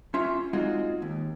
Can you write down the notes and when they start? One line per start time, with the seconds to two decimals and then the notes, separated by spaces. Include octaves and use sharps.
0.14 C#4 F4 E5 C6
0.53 G#3 C4 D#4 F4 F#4
1.02 D#2